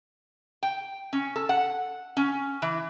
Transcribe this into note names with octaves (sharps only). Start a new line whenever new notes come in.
G5
C#4
A4
F#5
C#4
E3